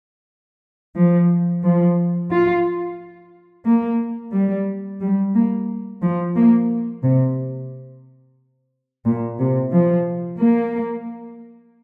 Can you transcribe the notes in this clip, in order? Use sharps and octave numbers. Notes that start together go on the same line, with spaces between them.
F3
F3
F4
A#3
G3
G3
A#3
F3
A#3
C3
A#2
C3
F3
A#3